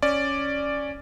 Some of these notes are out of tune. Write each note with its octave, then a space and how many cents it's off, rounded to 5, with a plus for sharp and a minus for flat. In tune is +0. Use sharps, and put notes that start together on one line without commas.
C#4 +0 D5 +0